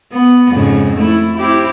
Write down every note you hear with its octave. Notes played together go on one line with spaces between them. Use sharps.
B3
F2 G#2 C#3
A3 E4
C4 E4 G4